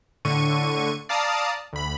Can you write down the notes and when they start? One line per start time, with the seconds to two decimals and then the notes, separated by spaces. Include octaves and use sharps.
0.25 A2 D3 C#6 D#7
1.09 D5 F5 A5 A#5 D#6
1.73 D2 B5